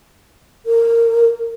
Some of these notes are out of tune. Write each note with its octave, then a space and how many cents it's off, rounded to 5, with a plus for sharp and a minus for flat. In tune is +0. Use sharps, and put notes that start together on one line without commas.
A#4 -15